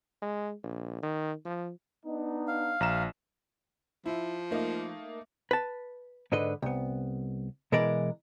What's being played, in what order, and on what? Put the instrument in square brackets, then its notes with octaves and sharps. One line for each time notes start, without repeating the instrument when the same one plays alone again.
[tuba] G#3
A#1
D#3
F3
[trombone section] B3 D4 D#4
[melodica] F5
[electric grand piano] A#1 A#5 E7
[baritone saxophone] F3 [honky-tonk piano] E4
[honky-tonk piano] A3 A#3 D#4
[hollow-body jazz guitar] B4 A5
G#2 D3 B4 D#5
C2 B3
B2 E3 G#3 A#4 D5